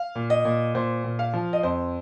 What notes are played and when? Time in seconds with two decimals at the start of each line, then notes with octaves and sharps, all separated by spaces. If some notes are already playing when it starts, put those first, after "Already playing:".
Already playing: F5
0.15 A#2
0.30 D#5
0.45 A#2
0.75 A#2 C5
1.04 A#2
1.19 F5
1.33 F3
1.53 D#5
1.63 F2 C5